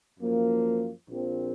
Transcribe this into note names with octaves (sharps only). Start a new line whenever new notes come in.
F#2 F3 A#3
A#1 A#2 F3 C4